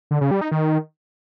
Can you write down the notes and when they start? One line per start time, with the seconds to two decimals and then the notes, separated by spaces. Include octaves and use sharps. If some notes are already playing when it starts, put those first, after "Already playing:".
0.11 D3
0.21 C#3
0.31 G3
0.41 D#4
0.51 D#3